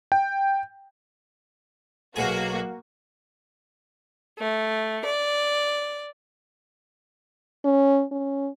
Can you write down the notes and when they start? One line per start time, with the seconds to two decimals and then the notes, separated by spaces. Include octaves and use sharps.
0.12 G5
2.16 B1 A#3 F#4 G#4
4.38 A3
5.05 D5
7.65 C#4
8.11 C#4